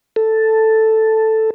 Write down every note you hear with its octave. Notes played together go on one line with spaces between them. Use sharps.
A4